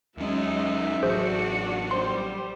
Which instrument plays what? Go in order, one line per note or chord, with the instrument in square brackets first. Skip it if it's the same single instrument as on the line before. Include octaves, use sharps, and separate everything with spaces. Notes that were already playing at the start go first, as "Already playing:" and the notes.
[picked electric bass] D#2 C#4 [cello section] F#3 G#3 D#4 [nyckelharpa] E5
[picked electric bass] A1 F#3 [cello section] D4 F#4 [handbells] G#4 C5
[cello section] G3 [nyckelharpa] C5 [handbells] C6